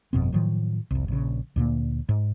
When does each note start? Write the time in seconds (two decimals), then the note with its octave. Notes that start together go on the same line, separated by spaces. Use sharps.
0.13 G1 F2 B2 C4
0.32 A2 D#3 F3 F#3
0.91 F1 C2
1.08 A#1 C#3
1.56 D2 A#2 A#3
2.09 G#2